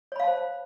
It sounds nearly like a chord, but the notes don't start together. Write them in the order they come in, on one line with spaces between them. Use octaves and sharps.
C#5 B5 F5 A5 C5